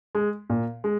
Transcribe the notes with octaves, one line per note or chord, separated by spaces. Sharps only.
G#3
A#2
G#3